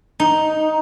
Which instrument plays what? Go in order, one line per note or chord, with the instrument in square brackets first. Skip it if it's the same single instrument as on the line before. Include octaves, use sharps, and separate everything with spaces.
[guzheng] D#4